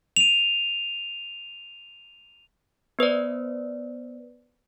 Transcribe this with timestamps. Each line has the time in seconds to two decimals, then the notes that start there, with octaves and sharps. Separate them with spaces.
0.16 D#7 F7
2.99 B3 B4 C5 D5